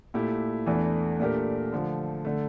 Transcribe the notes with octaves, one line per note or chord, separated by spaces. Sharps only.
A#2 A3 E4 G4
E2 E3 A3 D4 A4
A#2 A3 D4 G4 A#4
D3 F3 A3
D3 A3